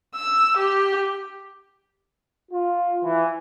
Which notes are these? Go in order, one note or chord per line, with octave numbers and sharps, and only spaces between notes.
E6
G4
F4
E3